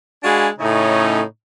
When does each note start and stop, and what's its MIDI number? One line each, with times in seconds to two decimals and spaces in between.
0.23 0.47 56
0.23 0.47 62
0.23 0.47 66
0.23 0.47 77
0.23 0.47 80
0.23 0.47 83
0.59 1.21 45
0.59 1.21 49
0.59 1.21 57
0.59 1.21 61
0.59 1.21 63